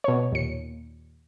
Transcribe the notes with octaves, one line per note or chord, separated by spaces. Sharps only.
B2 C#5
D#2 A#2 C#7